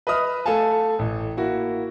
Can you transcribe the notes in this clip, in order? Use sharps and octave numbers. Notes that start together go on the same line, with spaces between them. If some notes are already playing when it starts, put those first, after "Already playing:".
B4 D#5 E5 B5 D#6 F6
A3 A4 F5 G#5 A5
A1
A#3 E4 F#4